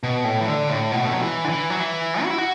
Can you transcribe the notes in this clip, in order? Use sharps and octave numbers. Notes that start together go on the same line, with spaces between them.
B2
A2
E3
D3
A2
B2
A3
F#3
E3
D3
E3
F#3
E3
F#4
E4
F#4